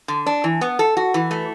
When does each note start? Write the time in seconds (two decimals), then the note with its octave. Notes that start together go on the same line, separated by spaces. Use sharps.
0.08 D3
0.26 D4
0.44 E3
0.61 B3
0.79 A4
0.97 F#4
1.14 E3
1.31 A3